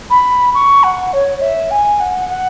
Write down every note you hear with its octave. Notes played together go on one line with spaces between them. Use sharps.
B5
C#6
F#5
C#5
E5
G#5
F#5
F#5